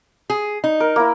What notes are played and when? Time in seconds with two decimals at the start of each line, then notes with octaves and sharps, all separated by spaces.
0.30 G#4
0.64 D#4
0.80 A#4
0.96 A#3 E4